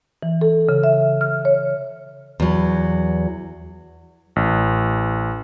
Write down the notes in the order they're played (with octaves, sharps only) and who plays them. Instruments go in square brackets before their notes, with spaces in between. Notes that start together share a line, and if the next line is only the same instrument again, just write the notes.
[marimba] E3
A4
C#3
E5
F6
C#5
[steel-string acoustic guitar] E2 F#3
[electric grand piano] A1